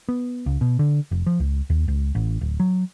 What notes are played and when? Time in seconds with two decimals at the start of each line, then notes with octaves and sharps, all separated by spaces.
0.08 B3
0.46 C#2
0.61 B2
0.79 D3
1.11 F1
1.26 F3
1.40 C#2
1.70 D#2
1.88 C#2
2.15 A1
2.41 D1
2.60 F#3